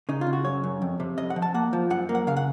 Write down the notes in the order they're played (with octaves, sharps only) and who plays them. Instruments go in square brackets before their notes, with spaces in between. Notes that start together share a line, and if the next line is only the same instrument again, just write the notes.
[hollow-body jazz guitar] C#3 D#4
F4
C#3
F#4
F#2 C#5
F#2
F2
C3
F2 D#5
F#5
F3
A5
A#3 F#5
F3
F#2 F#5
A#3
F#5
C#3 F5
F#5